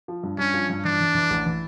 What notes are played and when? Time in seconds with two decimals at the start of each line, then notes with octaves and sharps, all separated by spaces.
0.08 F3
0.23 G2
0.38 G2 C#4
0.54 F3
0.70 G2
0.85 E3 D4
1.00 E3
1.15 E3
1.30 A1
1.46 E3